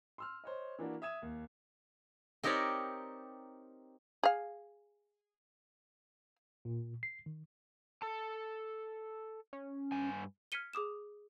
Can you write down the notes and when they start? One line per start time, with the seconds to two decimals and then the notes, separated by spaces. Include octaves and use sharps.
0.18 C6 E6 F6
0.44 C5 C#5 D#5
0.79 E3 A#3 D4 F#4
1.02 E5 D#6 G#6 E7
1.22 D#2
2.44 C4 D#4 G4 A#4 C#5 D5
4.23 G#4 F5
6.65 A#2
7.03 C7
7.26 D#3
8.02 A4 A5
9.53 C#4
9.92 G2 G#5
10.52 F6 G#6 B6 C#7 D#7 G7
10.73 G#4 D6 D#6 E7